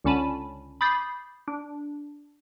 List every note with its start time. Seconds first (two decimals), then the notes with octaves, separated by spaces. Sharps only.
0.04 C#2 D3 C#4 A5 B5 D#7
0.81 B5 D6 D#6 G6 A6 C7
1.48 D4